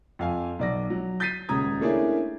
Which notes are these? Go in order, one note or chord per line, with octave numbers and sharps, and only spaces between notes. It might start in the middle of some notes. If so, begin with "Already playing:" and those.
F2 F5 G#5
B1 D5 A#6
F#3
G6 A6 B6 C7 D#7
D#1 C#2 C#3 A#5 D#6 G#6
A3 A#3 C#4 D4 E4 G#4